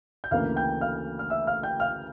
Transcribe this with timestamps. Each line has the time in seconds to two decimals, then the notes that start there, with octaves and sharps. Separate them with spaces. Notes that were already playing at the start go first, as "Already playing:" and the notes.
0.24 G6
0.31 D2 C#3 E3 A#3 D4 F5 F6
0.56 G5 G6
0.81 F5 F6
1.19 F6
1.30 E5 E6
1.47 F5 F6
1.63 G5 G6
1.80 F5 F6